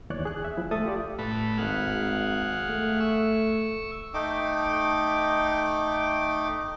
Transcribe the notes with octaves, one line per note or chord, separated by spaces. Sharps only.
D#2 E3 C#5 D5 F#6
G#4 F#6
E5
F3 E4
A3 A4 E5 D#6 A6
F4 G4 D5
A2 A3 B4
G#1 G#4 F5 F#5
A3
C#6 E6
A3 D#4 G5 D6